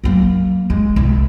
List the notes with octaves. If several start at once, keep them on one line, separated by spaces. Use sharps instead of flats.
F#3 A#3
G#3
C2